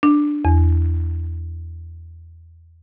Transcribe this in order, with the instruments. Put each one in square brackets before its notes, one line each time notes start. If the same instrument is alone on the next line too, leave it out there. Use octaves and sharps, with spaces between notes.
[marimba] D4
E2